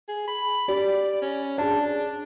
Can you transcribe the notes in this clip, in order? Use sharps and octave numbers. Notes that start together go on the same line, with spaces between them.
G#4
B5
G4 D5
C#4
D4 G#4 A5